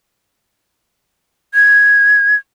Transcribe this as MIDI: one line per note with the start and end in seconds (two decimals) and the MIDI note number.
1.54 2.35 92